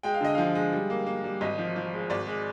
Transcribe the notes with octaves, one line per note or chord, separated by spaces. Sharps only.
G#3 G5
F5
D3 D#5
F3 F5
G#3
G3
A#3
A#3
G3
G#1 D#5
F3
F3
G#3
G#1 D5
G#3